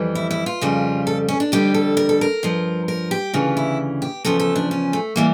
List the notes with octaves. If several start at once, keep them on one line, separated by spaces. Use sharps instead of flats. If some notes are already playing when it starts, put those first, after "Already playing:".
Already playing: F2 E3 G3
E4
E4
F4
F2 C#3 G3
A4
C#4
D4
F2 D3 G3 G4
A4
A#4
A4
A#4
G2 F3
A#4
G4
D2 C#3 E3 F4
E4
G4
E2 C#3 F3 A4
A4
D4
C#4
A3
E3 G3 A#3